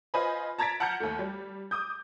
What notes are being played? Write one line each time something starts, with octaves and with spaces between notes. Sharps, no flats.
F4 B4 C5 D#5 G#5 B5
A5 A#5 G#6 A6 B6 D7
F#5 A5 A#5 F6 G6 C#7
D#2 A3
G3
D6 D#6 G6